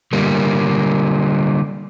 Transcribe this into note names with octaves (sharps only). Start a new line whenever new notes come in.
D3 G3 A#3